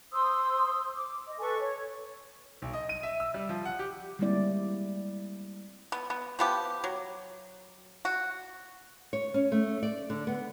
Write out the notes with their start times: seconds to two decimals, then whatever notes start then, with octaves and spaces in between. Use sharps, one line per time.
0.12 C5 C6 D#6 E6
0.96 D6
1.27 D#5
1.40 A4 B4 G#5 C#6
1.58 C#5
2.62 B1
2.73 D#5
2.89 D#7
3.03 E5
3.20 E6
3.34 G3
3.49 F3
3.65 F#5
3.79 G4
4.19 G3 G#3 A#3 C4 E4 D5
5.92 B3
6.10 B3
6.39 F3 B3 G4
6.84 F#3
8.05 F#4
9.13 C#5
9.34 C#4
9.52 A3
9.83 D5
10.10 D3
10.27 B3